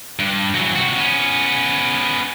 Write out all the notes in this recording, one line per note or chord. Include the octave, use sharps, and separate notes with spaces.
G2
E3 F#3
C3 F#4
B3 C#4